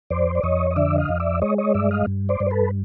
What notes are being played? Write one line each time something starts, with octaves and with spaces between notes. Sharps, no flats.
F2 C5 D5
D5
F2 C#5 D#5
D#5
D3 D5 E5
D#5 F5
F2
D5 E5
G#3 C#5 D#5
C#5 D#5
G2 D5 E5
D#5 F5
G2
C5 D5
G2
C5
A4 B4